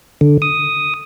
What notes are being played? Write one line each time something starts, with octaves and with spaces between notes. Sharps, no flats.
D3
D#6